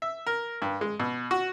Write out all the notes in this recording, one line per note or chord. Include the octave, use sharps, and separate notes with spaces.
E5
A#4
G2
G#3
B2
F#4